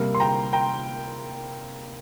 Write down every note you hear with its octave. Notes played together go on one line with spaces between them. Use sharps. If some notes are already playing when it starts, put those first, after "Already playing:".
Already playing: C3 G3 A#3
C6
G5 A#5
G5 A#5